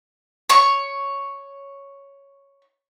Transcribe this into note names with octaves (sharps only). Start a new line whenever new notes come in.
C#5 C#6